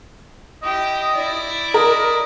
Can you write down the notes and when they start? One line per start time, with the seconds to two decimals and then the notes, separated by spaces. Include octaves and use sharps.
0.62 E4 G4 D#5
1.14 E4 D5
1.74 A#4 D#5